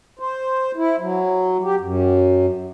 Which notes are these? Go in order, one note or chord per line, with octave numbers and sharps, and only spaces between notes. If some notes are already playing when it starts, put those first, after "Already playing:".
C5
E4
F#3
G4
F#2